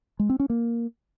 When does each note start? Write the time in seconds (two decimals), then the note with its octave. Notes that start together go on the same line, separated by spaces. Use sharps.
0.19 G#3
0.30 C4
0.40 C#4
0.50 A#3